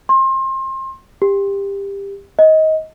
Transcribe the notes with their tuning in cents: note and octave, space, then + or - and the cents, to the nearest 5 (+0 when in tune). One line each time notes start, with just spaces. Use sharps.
C6 +30
G4 +20
D#5 +20